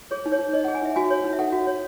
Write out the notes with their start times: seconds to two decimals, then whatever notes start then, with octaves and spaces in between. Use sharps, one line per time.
0.11 G#4 C#5
0.26 D#4
0.32 C#5
0.39 D#4
0.53 C#5 D#5
0.64 F#5
0.68 G#4
0.75 G#5
0.82 D#4 E5
0.96 F#4 G#5
1.10 C#5
1.24 D#4
1.33 E5
1.39 A4 F#5
1.52 F#4
1.67 C#5